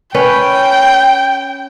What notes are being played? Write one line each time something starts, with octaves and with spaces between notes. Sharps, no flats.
C#4 B4 G5